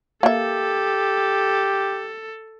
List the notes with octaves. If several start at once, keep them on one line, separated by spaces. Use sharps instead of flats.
A#3 G4 A4 E5